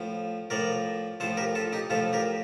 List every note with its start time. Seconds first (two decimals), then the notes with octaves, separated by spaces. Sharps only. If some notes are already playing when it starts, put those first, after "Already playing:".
Already playing: A2 F3
0.50 A2 F3 A#4 D5
1.20 A2 F3 A4 C5
1.37 G4 A#4
1.55 F4 A4
1.73 D#4 G4
1.90 A2 F3 F4 A4
2.13 G4 A#4